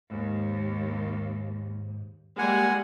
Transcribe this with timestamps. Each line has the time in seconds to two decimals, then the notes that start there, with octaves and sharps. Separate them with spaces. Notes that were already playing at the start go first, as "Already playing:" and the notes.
0.11 D#2 G#2
2.38 G3 G#3 A#3 F#5 G#5